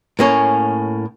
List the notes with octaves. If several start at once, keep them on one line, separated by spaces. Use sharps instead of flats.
A2 A#3 C#4